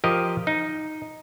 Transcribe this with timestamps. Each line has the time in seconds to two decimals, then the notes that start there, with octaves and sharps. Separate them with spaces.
0.04 F3 G4 A#4 D#5
0.47 D#4